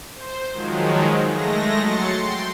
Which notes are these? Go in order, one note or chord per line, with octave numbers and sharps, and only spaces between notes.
C5
D#3 F3 F#3 G#3
G#3 A3 A#6
F#3 C6 A6 C#7
G5 C6